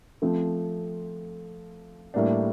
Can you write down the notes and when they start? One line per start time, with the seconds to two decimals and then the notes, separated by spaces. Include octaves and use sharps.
0.22 F3 A3 C4
2.14 A2 G3 A#3 D4